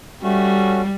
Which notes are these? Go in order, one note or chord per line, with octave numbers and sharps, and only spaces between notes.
G3 A3 C#4 F#4